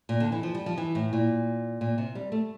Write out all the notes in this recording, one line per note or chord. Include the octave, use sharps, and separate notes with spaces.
A#2
D3
E3
F3
G3
F3
E3
A2
A#2
A#2
C3
G3
A3